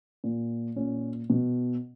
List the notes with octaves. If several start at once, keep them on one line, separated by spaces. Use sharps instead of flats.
A#2
A#2 C#4
B2